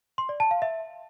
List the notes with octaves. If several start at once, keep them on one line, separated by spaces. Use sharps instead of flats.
C6
D5
A5
F5
E5